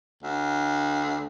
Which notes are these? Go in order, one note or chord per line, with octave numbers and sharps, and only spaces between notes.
D2